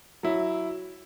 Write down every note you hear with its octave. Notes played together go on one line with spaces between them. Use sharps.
F#3 E4